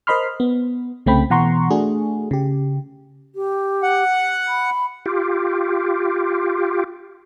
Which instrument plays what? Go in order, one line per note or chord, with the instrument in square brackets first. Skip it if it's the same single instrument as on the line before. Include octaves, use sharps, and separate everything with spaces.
[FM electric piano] A#4 C5 D#5 B5 C6 F6
B3
C2 C#3 A3 C4 G5 B5
B2 E3 F#5 A#5 C6 C#6
A3 D4 F#4 G#4
C#3 G4
[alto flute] G4
[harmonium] F#5
[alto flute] B5
[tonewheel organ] F4 G4